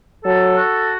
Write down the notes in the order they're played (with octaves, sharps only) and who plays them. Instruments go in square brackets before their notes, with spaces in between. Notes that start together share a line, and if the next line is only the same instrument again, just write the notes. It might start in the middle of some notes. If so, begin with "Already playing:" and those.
[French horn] F#3 [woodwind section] A4
[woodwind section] F#4